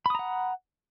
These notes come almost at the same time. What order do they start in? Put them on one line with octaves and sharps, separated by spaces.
B5 D#6 A#5 F#5